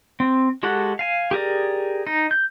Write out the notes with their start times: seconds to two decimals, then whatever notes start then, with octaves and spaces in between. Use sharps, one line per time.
0.20 C4
0.63 G#3 F#4 G4 A4 F#5
0.99 F5 G#5
1.31 G4 G#4 A#4 D5
2.07 D#4
2.31 G6